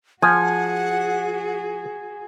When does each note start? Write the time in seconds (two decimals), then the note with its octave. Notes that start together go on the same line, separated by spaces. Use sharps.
0.22 F3 F#4 G#4 F#5 G#5